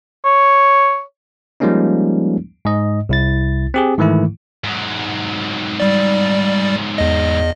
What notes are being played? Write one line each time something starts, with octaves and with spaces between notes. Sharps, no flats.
C#5
F3 G3 G#3 A#3 C#4 D#4
G#2 D#5
C2 E4 A6
C4 G4 G#4
G#2 D#3 E3 A3 E4
G#2 F#3
G3 D5
E2 D#5